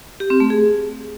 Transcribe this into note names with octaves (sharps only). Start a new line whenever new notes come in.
G4
C4
A3
G#4